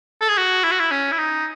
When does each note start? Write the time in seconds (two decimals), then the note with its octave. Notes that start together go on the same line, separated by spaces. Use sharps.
0.21 A4
0.29 G#4
0.38 F#4
0.64 E4
0.72 F#4
0.80 E4
0.91 C#4
1.12 E4
1.18 D#4